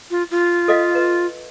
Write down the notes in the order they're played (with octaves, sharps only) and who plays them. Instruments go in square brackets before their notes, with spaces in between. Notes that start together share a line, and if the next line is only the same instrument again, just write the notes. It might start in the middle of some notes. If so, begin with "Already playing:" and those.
[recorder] F4
F4
[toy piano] A4 D#5 F5
B4